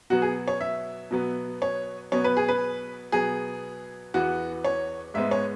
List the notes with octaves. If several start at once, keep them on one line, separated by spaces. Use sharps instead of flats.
B2 F#3 B3 F#4
G#4
C#5
E5
B2 F#3 B3
C#5
B2 F#3 B3 C#5
B4
G#4
B4
B2 F#3 B3 G#4
E2 E3 B3 F#4
C#5
G#2 G#3 B3 E5
C#5